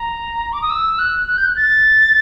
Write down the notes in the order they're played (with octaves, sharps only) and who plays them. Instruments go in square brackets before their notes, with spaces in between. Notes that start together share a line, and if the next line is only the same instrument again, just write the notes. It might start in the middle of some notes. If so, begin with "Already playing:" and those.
Already playing: [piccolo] A#5
D6
D#6
E6
F#6
F#6
G6
F#6
A6